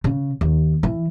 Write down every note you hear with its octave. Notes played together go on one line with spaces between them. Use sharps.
C#3
D#2
E3